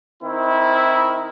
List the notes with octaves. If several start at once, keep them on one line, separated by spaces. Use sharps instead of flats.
D#3 C4 E4